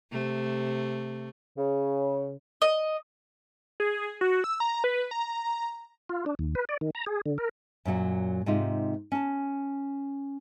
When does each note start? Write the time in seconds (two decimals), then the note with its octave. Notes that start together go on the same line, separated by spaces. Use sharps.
0.11 C3 A3
1.57 C#3
2.62 D#5
3.80 G#4
4.21 F#4
4.44 E6
4.60 A#5
4.84 B4
5.11 A#5
6.09 F4
6.26 D4
6.39 D#2
6.55 B4
6.69 D5
6.81 D#3
6.95 A#5
7.06 G#4
7.26 D3
7.38 A#4
7.85 F#2 A#2 F#3 F#5
8.46 G#2 C3 G#3 D#4 F4
9.12 C#4 A5